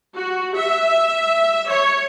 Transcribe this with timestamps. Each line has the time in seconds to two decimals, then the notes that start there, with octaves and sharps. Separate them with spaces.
0.16 F#4
0.56 E5
1.68 C#5